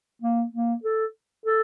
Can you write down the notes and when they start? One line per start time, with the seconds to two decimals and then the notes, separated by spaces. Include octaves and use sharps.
0.22 A#3
0.53 A#3
0.84 A4
1.46 A4